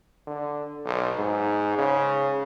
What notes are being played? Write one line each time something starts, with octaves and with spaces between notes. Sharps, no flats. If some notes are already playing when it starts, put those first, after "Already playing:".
D3
B1
G#2
C#3